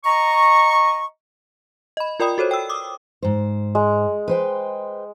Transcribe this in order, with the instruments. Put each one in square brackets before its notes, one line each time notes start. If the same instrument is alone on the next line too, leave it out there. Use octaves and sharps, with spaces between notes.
[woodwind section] D#5 A#5 C#6
[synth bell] D#5 B5
F4 A#4 D5 G5 B5 D#6
F#4 A4 C5 C#5
G5 E6
D6 D#6
[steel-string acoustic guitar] G#2 C5
[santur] G#3
[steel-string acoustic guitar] B4 C5 G5